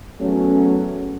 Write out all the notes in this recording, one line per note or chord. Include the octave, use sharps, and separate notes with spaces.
E2 F#3 A3 C#4